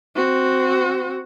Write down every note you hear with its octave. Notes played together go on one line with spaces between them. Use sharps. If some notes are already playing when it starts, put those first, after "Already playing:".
C4 F#4